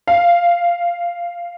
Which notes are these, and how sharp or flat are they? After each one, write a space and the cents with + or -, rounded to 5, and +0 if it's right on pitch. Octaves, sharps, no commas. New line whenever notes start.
F5 -10